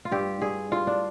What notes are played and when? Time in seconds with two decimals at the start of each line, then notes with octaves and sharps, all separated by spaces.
0.05 F4
0.12 G2 G4
0.41 G2 G#4
0.72 G2 F4
0.87 D4